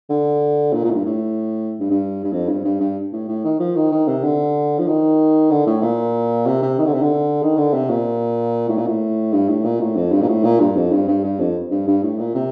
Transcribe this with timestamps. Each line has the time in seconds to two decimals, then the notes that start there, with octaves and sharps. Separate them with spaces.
0.10 D3
0.73 A#2
0.85 A#2
0.90 A2
0.95 G2
1.06 A2
1.80 G2
1.91 G2
2.25 G2
2.33 F2
2.49 G2
2.65 G2
2.80 G2
3.13 A2
3.28 A2
3.45 D#3
3.60 F3
3.76 D#3
3.92 D#3
4.08 C3
4.24 D3
4.79 F3
4.87 D#3
5.51 D3
5.67 A2
5.83 A#2
6.47 C3
6.62 C3
6.78 D#3
6.86 D3
6.94 C3
7.02 D3
7.42 D#3
7.58 D3
7.74 C3
7.90 A#2
8.69 A2
8.78 A#2
8.86 A2
9.33 G2
9.49 A2
9.65 A#2
9.80 A2
9.96 F2
10.12 G2
10.22 A#2
10.28 A2
10.44 A#2
10.60 G2
10.76 F2
10.92 G2
11.08 G2
11.24 G2
11.40 F2
11.71 G2
11.87 G2
12.03 A2
12.19 A#2
12.35 C3